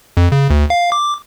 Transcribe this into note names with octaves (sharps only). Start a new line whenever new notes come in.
F2
C#3
D2
F5
D6